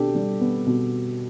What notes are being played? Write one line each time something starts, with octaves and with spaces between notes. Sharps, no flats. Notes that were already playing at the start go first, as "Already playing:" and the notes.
Already playing: B2 D4 G4 A4
G3
B3
B2